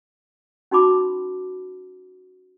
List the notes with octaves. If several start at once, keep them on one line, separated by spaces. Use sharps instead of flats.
C#4 D#4 F#4 A5 B5 D6